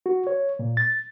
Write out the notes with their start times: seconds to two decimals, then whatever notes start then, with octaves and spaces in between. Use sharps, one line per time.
0.06 F#4
0.27 C#5
0.59 A#2
0.77 A6